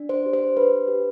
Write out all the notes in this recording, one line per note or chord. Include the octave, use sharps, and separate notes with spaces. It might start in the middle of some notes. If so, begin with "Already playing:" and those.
Already playing: D4
C5
G4
C5
D4 B4
G4